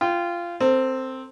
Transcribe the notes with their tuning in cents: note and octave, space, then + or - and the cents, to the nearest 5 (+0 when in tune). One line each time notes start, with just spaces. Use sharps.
F4 -15 G5 +0
C4 +0 A4 +35